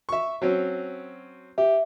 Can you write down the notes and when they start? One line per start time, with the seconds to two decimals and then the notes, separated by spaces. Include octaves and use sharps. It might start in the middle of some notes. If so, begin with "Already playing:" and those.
0.09 E5 C#6
0.42 F#3 C4 C#4
1.58 G4 E5